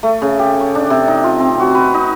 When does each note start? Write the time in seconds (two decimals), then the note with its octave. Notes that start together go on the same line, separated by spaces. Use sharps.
0.03 A3
0.22 C#3
0.39 G4
0.60 C#5
0.75 D4
0.90 C3
1.08 D#4
1.24 F4
1.40 C4
1.60 F#4
1.75 B4
1.94 D#4